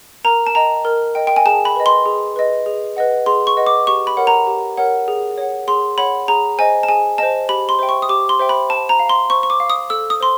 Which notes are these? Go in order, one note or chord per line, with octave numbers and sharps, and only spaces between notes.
A#4 A#5
A5
D#5 G5 A#5
A#4
D#5 G5
G5
G#5
G#4 A5
B5
B4 D#5
C6
G#4
B4 D#5
G#4
B4 D#5 F#5
G#4 C6
C#6
B4 D#5 F#5
D6
G4 C#6
B5
A#4 C#5 F#5
A#5
G4
A#4 C#5 F#5
G#4
C#5 F#5
G#4 C6
C#5 F#5 B5
G#4 A#5
C5 D#5 G#5
A5
G#4 G#5
C5 D#5 A5
G4 B5
C6
C5 E5 G5
C#6
D#6
G4 D6
C6
C5 E5 G5
B5
C5 A5
A#5
F5
C6
C5 C#6
C#6
D6
F5
D#6
A4 E6
D#6
C5 C6